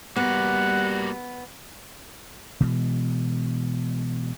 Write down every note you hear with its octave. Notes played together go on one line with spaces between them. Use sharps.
G3 A#3 B3 F#4 F#5
B2 E3 G#3